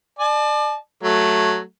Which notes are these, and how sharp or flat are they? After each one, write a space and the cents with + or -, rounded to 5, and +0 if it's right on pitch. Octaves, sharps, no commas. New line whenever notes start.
D5 +35 A5 -30
F#3 +0 A3 +0